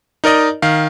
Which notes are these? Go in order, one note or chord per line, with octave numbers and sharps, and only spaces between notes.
D#4 A#4 D5 D#5
D#3 F5